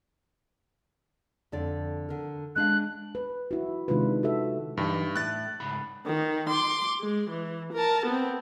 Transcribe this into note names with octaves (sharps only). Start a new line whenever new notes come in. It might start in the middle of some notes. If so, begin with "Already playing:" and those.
F2 D3 D5
D3 A#4
G#3 D4 F5 F#6
B4
E4 F#4
C3 D#3 G#3 D4 F4 B4
F#4 A4 E5
G2 E3 D#4
A2 F#6 A6
C#2 G#2 B5
D#3
C6 D6
G#3
E3
A#4 A5
B3 C4